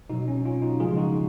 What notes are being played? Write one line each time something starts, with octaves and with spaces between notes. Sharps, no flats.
B2 F#3 D#4 F#4
C#4
C#4 F4
D#4 F#4
C#3 F3 G#3 F4 G#4
D#4 F#4